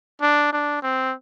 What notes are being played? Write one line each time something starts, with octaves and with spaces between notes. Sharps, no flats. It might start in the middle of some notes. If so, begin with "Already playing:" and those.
D4
D4
C4